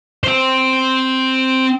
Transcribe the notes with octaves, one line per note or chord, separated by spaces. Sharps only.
C4 C5